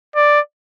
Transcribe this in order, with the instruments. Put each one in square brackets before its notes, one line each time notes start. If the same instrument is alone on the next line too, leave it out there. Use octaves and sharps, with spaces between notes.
[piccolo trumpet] D5